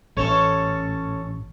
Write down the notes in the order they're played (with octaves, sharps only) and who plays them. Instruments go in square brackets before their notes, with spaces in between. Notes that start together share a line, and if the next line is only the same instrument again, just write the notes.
[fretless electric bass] A1 [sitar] C#4 A4 C#5